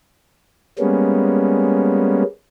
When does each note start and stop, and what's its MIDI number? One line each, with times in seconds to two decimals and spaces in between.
0.79 2.23 55
0.79 2.23 56
0.79 2.23 58
0.79 2.23 59
0.79 2.23 61